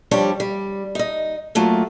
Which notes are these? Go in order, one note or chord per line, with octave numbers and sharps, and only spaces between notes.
F3 G3 D4 G4 C#5
G3
D#4 D#5
F#3 A3 A#3 F4